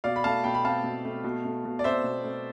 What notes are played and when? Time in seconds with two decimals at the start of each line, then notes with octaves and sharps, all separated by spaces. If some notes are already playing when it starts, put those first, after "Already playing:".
0.04 B2 D5 F5
0.16 B5
0.24 A3 F5 A5
0.44 B2 G5 B5
0.54 B5
0.64 C4 F5 A5
0.84 B2
1.05 A3
1.24 B2
1.44 A3
1.65 B2
1.79 D5
1.84 C4 C5 E5
2.04 B2
2.24 A3